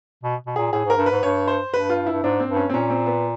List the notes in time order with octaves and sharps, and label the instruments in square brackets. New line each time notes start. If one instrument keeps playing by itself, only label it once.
[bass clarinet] B2
B2
[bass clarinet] A#2 [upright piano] G#4
[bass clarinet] A2 [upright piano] G#4
[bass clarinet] G#2
[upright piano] A#4
[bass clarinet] G2
[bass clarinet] G#2 [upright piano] B4
[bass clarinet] G2 [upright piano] C#5
[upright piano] C5
[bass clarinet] G2 [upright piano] B4
[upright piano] F4
E4
[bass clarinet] G2
[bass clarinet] G#2 [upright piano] D4
[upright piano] C4
[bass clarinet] G2
[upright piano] C#4
C4
[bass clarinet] A#2 [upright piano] C#4
[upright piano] C4
B3